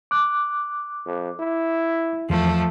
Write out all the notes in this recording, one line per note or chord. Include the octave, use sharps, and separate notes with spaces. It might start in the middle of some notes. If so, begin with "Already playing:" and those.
D6 F#6
F2
E4
E2 F3 A3